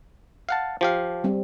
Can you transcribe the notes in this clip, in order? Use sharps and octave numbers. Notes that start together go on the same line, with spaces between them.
F5 F#5 A5
F3 G4 F5
G3 C4